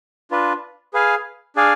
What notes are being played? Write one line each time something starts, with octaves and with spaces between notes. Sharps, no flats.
D4 F4 B4
G#4 B4 F5 G#5
D4 G#4 D5 F5 G#5